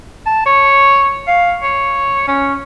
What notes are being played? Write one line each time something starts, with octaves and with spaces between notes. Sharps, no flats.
A5
C#5
F5
C#5
C#4